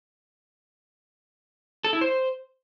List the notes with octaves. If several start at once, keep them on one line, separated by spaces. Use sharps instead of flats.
A4
E4
C5